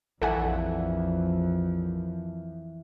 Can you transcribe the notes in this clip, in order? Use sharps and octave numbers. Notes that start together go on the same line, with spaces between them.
A#1 F2 E3 F3 A4 F#5 G#5